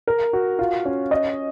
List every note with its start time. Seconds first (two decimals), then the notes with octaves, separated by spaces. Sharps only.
0.08 A#4
0.33 F#4
0.59 F4
0.85 C#4
1.11 D#5